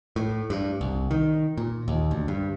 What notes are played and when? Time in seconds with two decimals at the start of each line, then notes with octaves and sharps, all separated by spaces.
0.16 A2
0.50 G2
0.81 C2
1.11 D#3
1.58 A#2
1.88 D#2
2.11 D2
2.28 G2